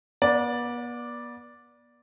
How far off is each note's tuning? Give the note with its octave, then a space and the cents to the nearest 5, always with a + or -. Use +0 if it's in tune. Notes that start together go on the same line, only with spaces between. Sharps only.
B3 -40 D5 +0